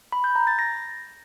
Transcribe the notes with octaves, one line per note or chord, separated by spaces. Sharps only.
B5
G6
A#5
A6
A#6